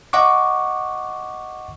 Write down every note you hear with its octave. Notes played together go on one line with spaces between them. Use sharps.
D#5 F#5 C#6 D6